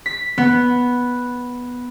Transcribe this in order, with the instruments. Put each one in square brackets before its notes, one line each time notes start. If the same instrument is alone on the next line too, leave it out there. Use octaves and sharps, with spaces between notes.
[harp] B6
B3